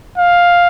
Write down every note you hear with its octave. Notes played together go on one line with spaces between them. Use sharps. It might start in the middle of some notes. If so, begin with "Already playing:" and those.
F5